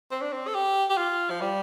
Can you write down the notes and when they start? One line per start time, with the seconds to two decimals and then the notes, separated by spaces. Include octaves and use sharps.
0.11 C4
0.21 D4
0.32 C4
0.48 A4
0.55 G4
0.89 G4
0.97 F4
1.30 F3
1.41 G3